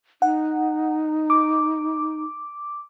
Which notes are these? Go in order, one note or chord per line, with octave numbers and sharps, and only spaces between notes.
D#4 F#5
D6